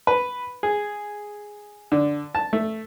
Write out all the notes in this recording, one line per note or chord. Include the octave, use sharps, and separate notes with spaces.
B4
G#4
D3
A5
A3